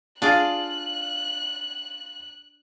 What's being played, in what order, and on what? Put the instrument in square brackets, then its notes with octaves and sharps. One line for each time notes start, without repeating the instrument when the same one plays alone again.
[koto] D4 G#4 D5 [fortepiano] F4 F5 [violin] F#6